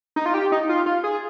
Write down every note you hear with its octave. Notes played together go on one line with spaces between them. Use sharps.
D#4
F4
G4
D#4
F4
F4
G#4